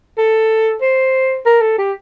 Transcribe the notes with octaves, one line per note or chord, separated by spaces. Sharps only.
A4
C5
A#4
A4
G4